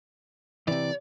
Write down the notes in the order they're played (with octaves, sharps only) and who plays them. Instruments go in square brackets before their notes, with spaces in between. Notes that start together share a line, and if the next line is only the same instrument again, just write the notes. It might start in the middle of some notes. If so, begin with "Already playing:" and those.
[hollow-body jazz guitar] C3 E3 [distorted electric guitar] D5